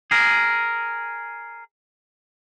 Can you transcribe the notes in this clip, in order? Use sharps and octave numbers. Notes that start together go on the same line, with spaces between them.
G#4 A#4